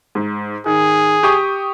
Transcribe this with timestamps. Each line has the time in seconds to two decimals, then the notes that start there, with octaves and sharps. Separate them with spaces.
0.15 G#2
0.66 D#3 G#4
1.23 G4 C#6 D#6